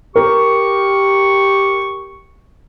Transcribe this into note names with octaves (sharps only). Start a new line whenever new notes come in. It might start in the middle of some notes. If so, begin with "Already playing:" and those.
G4 A#4 C#6